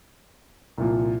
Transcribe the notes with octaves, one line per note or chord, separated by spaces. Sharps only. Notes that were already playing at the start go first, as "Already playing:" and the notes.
C2 A#2 F3